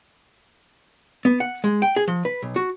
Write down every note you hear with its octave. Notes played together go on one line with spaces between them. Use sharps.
B3
F#5
G#3
G5
G#4
F3
B4
B1
F#4